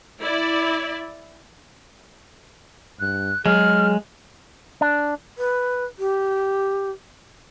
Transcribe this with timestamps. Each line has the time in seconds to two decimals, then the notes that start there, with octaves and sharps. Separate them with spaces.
0.20 E4 D5
3.00 G2 F#6
3.46 F#3 G#3 G#4 F6
4.81 D4
5.38 B4
5.99 G4